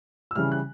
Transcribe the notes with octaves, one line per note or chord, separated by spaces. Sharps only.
E6
C#3 E3 G3 F6
F#6